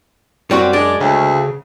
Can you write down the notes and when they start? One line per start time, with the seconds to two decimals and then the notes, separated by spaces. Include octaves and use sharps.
0.51 F#2 G3 C4 F#4
0.73 G#3 D4
1.00 D2 C#3